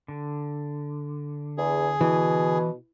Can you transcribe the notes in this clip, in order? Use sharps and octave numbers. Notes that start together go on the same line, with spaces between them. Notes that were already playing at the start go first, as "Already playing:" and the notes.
D3
E2 G#4
B2 E3